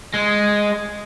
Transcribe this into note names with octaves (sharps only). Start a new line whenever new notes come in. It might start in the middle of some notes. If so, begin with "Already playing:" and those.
G#3